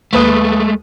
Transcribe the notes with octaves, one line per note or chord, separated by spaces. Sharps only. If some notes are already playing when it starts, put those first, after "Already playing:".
D#2 G#3 A3 B4 D#6